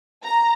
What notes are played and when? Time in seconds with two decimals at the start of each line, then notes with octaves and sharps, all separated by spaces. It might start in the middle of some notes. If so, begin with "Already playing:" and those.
0.24 A#5